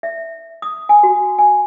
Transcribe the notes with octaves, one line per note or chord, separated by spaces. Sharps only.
E5
D#6
G#5
F#4
G#5